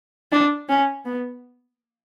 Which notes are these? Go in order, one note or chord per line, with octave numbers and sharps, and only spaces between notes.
D4
C#4
B3